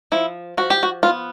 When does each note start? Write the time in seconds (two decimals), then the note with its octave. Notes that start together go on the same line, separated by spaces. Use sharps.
0.12 F3 E4
0.57 F3 F#4
0.70 G4
0.83 F#4
1.03 B3 F4